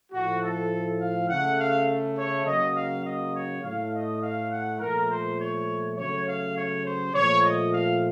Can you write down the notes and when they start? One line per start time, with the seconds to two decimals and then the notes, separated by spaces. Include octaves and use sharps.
0.12 A2 F3 A3 F#4
0.41 A4
0.99 F5
1.29 C#3 A3 F#5
1.58 F5
2.17 C#5
2.45 C#3 F#3 A#3 D#5
2.75 F5
3.04 D#5
3.34 C#5
3.63 A2 A3 F5
3.93 D#5
4.22 F5
4.50 F#5
4.80 A#2 F3 A3 A#4
5.09 C5
5.38 C#5
5.97 C#3 F#3 A3 C#5
6.26 F5
6.56 C#5
6.84 C5
7.14 A#2 F3 A3 C#5
7.43 D#5
7.73 F5